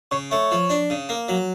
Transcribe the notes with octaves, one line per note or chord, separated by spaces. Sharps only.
C#3 C#5
A3 C#5
F3
D4
C#3
A#3
F#3